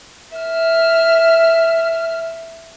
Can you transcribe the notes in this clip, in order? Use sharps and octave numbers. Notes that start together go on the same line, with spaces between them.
E5 F6